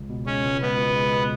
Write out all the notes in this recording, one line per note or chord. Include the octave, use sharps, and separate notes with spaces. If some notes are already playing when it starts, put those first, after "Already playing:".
Already playing: C#2
B2
G#3 C#4
C#2
C#2 B3
B2
G#3